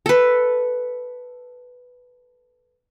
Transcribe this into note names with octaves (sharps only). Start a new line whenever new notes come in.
A4 B4